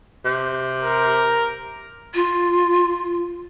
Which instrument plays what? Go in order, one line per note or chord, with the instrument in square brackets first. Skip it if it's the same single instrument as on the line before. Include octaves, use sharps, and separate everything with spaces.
[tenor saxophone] C3
[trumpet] A#4
[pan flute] F4